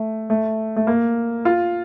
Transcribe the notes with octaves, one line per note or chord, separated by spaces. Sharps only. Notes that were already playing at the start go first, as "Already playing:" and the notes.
Already playing: A3
A3
A3
A#3
F4